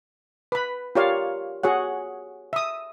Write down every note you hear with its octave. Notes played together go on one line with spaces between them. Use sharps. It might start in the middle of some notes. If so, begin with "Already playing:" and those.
B4 B5
F4 G4 A#4 C#5 D5 F5
F#4 G#4 C#5 F#5
E5 D#6